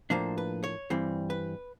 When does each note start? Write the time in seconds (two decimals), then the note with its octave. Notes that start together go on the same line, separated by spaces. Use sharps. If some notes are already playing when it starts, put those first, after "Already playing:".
0.10 A2 F3 A#3 D4 C5
0.38 B4
0.64 C#5
0.90 G2 E3 G3 C4
1.30 B4